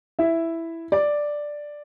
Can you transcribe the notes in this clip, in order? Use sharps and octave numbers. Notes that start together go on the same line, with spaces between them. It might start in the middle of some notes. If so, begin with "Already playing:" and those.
E4 E5
D5